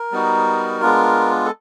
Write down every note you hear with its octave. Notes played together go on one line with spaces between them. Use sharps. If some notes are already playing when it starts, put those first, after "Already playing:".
Already playing: A#4
G3 B3 D#4 F#4
G#3 B3 D4 F4
A4